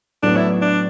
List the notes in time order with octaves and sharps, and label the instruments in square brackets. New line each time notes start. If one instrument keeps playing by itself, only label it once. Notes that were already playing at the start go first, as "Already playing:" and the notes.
[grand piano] A2 F#3 B3 [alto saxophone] D4
[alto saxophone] E4
D4